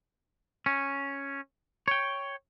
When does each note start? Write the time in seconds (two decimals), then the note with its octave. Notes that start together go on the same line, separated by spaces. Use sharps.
0.66 C#4
1.88 C#5 G5